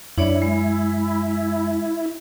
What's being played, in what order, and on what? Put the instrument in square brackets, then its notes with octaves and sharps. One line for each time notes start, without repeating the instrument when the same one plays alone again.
[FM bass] F#2 [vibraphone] D4 C#5 D5 [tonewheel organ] E4
[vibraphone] G#3